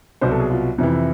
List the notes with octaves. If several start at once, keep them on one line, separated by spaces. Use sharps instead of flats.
C2 B2 F#3 C5
A4
G#4
F4
F2 C3 E3